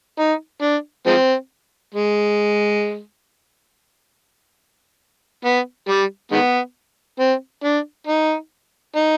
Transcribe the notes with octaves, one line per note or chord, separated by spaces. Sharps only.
D#4
D4
F3 G#3 C4
G#3
B3
G3
D#3 G#3 B3
C4
D4
D#4
D#4